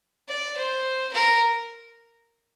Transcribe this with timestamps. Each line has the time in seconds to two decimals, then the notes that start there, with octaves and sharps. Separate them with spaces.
0.28 D5
0.57 C5
1.13 A#4